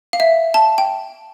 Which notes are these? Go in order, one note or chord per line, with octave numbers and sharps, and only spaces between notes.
F5
E5
A5
G5